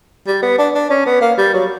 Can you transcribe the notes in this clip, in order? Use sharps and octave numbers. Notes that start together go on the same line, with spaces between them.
G3
B3
D4
D4
C#4
B3
A#3
G3
F#3